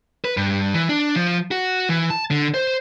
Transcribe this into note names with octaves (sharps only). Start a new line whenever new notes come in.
B4
G2
E3
D4
F3
F#4
E3
A5
D3
C5